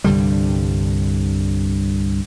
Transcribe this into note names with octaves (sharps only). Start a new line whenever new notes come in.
C2 G2 D3 G3